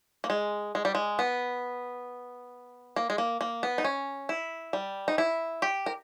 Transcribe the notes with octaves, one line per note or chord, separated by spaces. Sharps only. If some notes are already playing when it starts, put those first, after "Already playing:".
A#3
G#3
G#3
G3
G#3
B3
A#3
G#3
A#3
A#3
B3
D#4
C#4
E4
G3
D#4
E4
G4
A#4